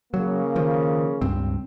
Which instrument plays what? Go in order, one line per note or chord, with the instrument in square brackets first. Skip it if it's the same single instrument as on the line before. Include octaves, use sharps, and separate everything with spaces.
[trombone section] C#3 A#3 [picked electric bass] F#3
[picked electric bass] D#3 F3
C#2 G2 C4